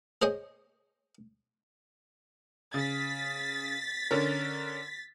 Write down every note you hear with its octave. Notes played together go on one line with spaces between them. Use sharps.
G#4 C5 C#5 D#5 G#5
C#3 A6 B6
D3 C#4 A#4